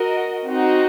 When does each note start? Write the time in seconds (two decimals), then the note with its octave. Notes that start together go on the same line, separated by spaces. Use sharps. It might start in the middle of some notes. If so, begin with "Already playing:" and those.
Already playing: F#4 A#4 D#5
0.47 C4 D#4 F#4